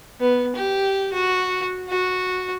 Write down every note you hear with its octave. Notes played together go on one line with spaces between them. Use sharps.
B3
G4
F#4
F#4